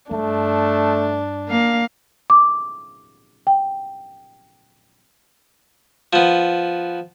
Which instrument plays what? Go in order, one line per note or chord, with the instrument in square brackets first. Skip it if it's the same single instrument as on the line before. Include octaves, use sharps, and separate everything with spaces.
[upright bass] G2 [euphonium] A3 [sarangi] D4
[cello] A#3 F5
[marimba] D6
G5
[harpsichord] F3 B3